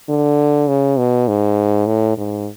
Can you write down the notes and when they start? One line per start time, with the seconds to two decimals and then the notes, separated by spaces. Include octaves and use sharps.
0.09 D3
0.68 C#3
0.98 B2
1.28 G#2
1.87 A2
2.17 G#2